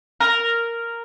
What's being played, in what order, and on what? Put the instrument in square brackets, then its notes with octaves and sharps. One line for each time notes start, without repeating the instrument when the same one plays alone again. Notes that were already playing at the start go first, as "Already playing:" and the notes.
[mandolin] A#4